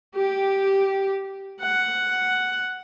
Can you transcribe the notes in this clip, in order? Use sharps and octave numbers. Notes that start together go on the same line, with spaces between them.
G4
F#5